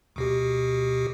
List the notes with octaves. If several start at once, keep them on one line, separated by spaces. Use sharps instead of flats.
D2 B2 G4